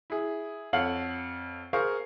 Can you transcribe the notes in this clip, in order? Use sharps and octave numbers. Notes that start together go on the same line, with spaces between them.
E4 G#4
F2 A4 C#5 F5 F#5 F#7
G#4 A#4 C5 F5 A#5 C#6